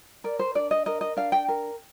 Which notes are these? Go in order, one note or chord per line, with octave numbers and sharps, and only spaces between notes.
A#4 D5
C5
D4 D5
D#5
A#4 D#5
D#5
D4 F5
G5
A#4